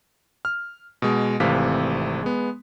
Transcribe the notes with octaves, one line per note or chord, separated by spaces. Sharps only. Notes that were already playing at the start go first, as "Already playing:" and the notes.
F6
B2 G#3
G#1 C3 E3 A3 F5 B6
G#3 B3